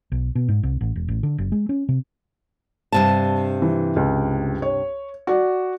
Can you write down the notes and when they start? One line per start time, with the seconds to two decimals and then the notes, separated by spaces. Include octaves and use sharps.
0.12 B1
0.35 B2
0.48 G#2
0.63 C2
0.81 A1
0.96 E1
1.08 A1
1.23 D3
1.38 F#1
1.52 G#3
1.69 C#4
1.89 C3
2.92 G2 C3 A5
3.62 E3
3.96 C#2
4.62 C#5
5.27 F#4 D5